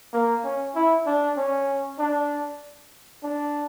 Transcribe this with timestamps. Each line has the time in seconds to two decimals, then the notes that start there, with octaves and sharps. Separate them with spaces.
0.13 A#3
0.44 C#4
0.75 E4
1.06 D4
1.37 C#4
1.99 D4
3.23 D4